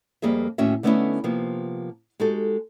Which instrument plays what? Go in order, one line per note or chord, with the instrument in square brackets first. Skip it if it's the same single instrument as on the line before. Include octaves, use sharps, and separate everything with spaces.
[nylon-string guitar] F2 G3 A#3 G#4 E5
D#2 A2 C#4 F#4 E5
D3 A3 B3 C#4 D#4 E4
C3 F3 A#3 B3
G#3 D#4 F#4 G4 A4